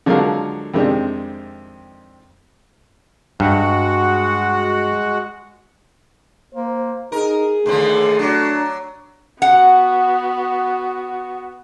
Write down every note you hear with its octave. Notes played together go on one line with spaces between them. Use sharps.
D3 F3 F#3 G#3 A#4 F5
F2 C3 D#3 G#3 C4 D4
G2 G#3 F#4 F#5
A#3 C5
D#4 G#4 A#4
D#2 D3 F3 A3
F#3 D4
B3 F#4 F#5